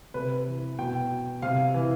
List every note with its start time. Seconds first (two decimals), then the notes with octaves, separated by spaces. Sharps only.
0.14 C3 B4
0.47 E3
0.79 B2 G5
1.42 C3 F5
1.74 E3